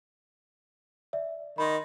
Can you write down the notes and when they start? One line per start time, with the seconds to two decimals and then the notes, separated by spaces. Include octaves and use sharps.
1.13 D5 E5
1.58 D#3 D#5 B5 C6